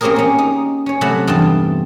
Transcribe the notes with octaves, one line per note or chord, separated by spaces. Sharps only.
A#3 C4 C#4 G4 G#4 A#4
A#3 C#4
D#4
C#4 C#5
C3 F#3 A3 F#5 B5
E2 G2 F4 G5 A5